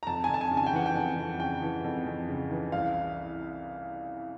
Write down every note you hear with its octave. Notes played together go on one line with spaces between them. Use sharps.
A#5
F2 A5
G#5
F2 A5
G#5
C#3
G#5
G5
E3 F#5
G5
F2
F2
C#3 G5
E3
F2
F2
C#3
E3
C2 F5